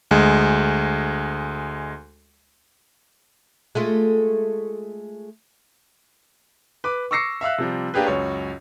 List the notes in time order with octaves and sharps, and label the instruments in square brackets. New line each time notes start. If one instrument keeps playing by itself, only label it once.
[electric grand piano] D2 G#3
[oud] G#3 A3 F4
[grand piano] B4 D6
C#6 D6 E6 A#6 C7 C#7
E5 F5 E6 F#6
C3 F3 G3
A#3 D4 G4 G#4 B4
C#2 F#2 C#5